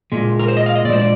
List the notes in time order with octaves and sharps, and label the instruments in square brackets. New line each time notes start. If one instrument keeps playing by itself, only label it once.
[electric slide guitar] A#2 G#3
A#4
C5
D#5
F5
D#5
A#2 D5
G#3 C5
D5